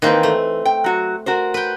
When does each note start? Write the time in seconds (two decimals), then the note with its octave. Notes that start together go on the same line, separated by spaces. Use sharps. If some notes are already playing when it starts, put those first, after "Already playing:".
0.02 D#3 E3 A#3 C4 B4
0.23 A3
0.65 G5
0.84 F#3 F#4
1.26 F#4 A#4 C5
1.54 B4 G5